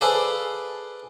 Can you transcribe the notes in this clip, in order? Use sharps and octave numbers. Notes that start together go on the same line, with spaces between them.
G#4 A4 B4 C5 D5 F5